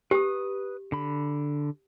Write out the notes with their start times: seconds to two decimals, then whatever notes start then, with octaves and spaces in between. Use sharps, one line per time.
0.11 G4 B4 D#6
0.92 D3 B5